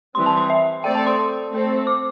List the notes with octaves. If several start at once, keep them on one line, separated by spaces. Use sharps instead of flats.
E3 G3 C4 C6
A5
C6
E5
A3 C4 A4 D5 G5
A5
C6
A3 C4 A4
D6